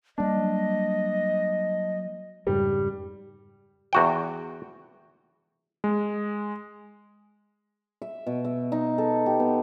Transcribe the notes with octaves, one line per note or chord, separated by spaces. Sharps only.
G3 A#3 D4 D#5
F#3
F2 G#2 C#3 G3
E2 F#4 G5
G#3
E5
B2
E5
D#4
A4
G4
B3